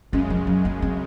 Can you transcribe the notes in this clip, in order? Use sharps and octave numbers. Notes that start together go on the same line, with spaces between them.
F#2 C#3 G#3 C#4
F3
F#3
A#3
C4